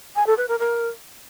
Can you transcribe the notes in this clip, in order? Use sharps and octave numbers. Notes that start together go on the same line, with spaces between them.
G#5
A4
B4
A#4
A#4